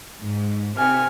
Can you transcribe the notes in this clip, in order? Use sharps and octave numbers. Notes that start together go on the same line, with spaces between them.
G#2
C3 G#5 F6